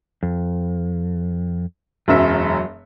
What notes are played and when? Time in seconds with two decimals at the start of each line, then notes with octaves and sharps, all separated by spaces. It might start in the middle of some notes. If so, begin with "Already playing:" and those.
0.23 F2
2.08 E1 F#2 F#3 E5